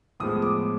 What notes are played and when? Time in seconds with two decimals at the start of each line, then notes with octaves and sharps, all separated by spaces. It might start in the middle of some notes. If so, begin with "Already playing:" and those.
0.20 A2 F3 G#3 B3 D#6
0.42 D6